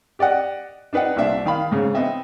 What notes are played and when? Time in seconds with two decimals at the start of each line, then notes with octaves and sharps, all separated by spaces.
0.19 G4 D5 D#5 F#5
0.93 D4 D#4 B4 D#5 F#5
1.16 C2 A#2 D4 E5
1.46 D#3 F5 B5
1.71 G#2 C#3
1.95 B3 C4 D#5 E5